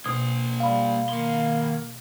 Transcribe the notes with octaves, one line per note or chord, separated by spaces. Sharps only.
B2 A#3 C5
G3 F5 B5
D#3 A#3 C6